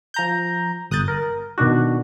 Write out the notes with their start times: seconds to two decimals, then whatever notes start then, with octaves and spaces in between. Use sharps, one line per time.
0.14 F3 A#5 G6
0.91 G1 D#6 F#6 G6 A6
1.08 A#4
1.58 B2 D#3 D4 F#4